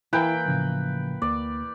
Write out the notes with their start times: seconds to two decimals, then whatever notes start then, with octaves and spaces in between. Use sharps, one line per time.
0.13 E3 A#3 E4 B4 G5
0.46 A2 C#3 F3
1.22 D2 A#3 D5